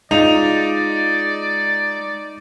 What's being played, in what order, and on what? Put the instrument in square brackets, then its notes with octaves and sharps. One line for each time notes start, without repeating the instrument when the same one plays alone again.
[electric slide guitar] G#3 F4 [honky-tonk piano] D#4 F7 [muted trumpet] D5